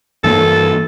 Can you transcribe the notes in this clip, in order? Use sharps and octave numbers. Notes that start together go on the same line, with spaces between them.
G2 E3 A#3 A4